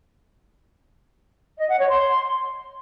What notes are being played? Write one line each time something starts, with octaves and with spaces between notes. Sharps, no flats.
D#5
F#5
C#5
C6